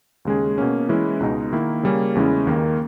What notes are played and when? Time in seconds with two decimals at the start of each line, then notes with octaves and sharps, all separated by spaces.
0.25 D#2 C#3 G#3 C#4 G#4
0.58 B2 A#3 C#4
0.89 E3 G#3 C#4 E4
1.20 C#2 B2 G#3 D#4
1.53 D#3 A#3 E4
1.83 C#3 G3 A#3 C#4
2.15 E2 C#3 G#3 C#4 E4
2.47 D#2 D#3 A#3